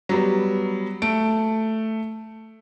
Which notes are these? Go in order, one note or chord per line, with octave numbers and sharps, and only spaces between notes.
F#3 G3 B3
A3 D7